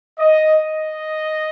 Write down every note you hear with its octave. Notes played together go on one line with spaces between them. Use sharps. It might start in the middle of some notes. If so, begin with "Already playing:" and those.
D#5
D#5